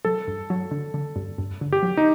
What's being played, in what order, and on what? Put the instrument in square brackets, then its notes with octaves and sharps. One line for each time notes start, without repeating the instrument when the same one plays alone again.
[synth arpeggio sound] F#3 [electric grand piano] A4
[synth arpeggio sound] G2
F#3
D3
D3
G2
G2
D3
[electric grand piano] G4
[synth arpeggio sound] F#3
[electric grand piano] D#4